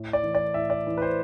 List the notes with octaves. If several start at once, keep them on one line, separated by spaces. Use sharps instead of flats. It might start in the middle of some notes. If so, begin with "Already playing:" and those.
Already playing: A2
D5
E3
D5
A2 E5
D5
E3
B4
C5